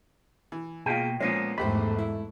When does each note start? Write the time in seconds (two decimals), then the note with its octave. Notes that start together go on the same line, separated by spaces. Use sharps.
0.52 E3
0.86 B2 G#3 A#3 F4 G5
1.20 A#2 F3 G#3 A#3 B3 C#4
1.58 A#1 E2 G#2 A3 G4 C5 B5
1.99 E4